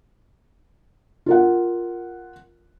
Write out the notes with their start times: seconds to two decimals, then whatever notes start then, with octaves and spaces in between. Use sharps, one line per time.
1.26 F4 A#4 F#5